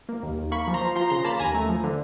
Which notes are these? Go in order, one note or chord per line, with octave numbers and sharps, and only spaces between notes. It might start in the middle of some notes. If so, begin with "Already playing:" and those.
A#3
D#2
D#2
A#3 B5 C#6
F3
A#5 C6
F3
F3 A#5 C6
C#3 A#5 C6
A#3 A5 B5
D#2 G#5 A#5
A3
F3
D3